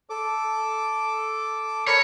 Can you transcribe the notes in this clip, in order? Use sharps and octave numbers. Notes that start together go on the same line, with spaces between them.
A4 D6
A#4 C#5 B5 F6